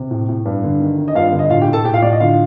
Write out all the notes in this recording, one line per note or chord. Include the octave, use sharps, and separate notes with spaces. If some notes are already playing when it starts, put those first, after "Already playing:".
Already playing: C3
A2
A2
G2
D3
D#3
D#3
D#5
G2 F4 F5
D3
D#5
A2 F4 F5
G4 G5
A2
A4 A5
A2 G4 G5
F4 F5
A2 D5
D#5
D3 F4 F5